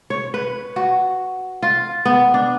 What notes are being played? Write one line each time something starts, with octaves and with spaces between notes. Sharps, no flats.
C#5
B4
F#4
F4
B3
D4